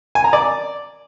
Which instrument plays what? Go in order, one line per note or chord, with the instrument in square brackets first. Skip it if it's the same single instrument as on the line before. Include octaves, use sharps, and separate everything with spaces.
[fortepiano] G#5
A#5
D5